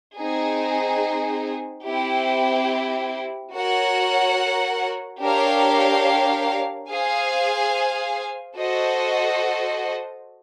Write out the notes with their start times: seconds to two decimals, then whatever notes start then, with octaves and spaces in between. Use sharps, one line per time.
0.16 C4 D#4 G#4
1.84 C4 E4 G4
3.53 F#4 A#4 C#5 F#5
5.21 D4 G4 A#4 C#5 F5
6.89 G#4 C5 F5 G#5
8.57 F#4 A4 C5 D#5